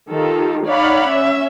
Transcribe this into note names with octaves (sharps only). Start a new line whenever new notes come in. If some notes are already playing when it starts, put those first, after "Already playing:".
D#3 F4 G4 A4
D#4 C#5 D5 F5 F#5 B5
C#4 E5